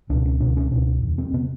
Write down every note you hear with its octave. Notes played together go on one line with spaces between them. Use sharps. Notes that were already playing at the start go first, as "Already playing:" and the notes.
C#2 B2 D4
C#4
C#2 B2 D4
C#4
C#2 B2 D4
E2
C3
C4
C3 B3